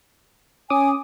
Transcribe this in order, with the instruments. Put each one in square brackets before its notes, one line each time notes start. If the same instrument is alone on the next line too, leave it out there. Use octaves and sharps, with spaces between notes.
[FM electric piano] C#4 D6 D#6 [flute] G#5